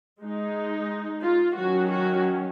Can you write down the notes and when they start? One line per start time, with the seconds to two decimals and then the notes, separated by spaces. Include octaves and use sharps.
0.20 G#3 D#4
1.21 F4
1.54 D#3 F#3 C#4 F#4
1.89 F#4